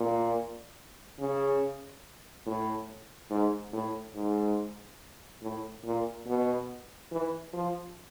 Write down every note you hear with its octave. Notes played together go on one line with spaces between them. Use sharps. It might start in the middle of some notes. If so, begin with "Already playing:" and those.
Already playing: A#2
C#3
A2
G#2
A2
G#2
A2
A#2
B2
E3
F3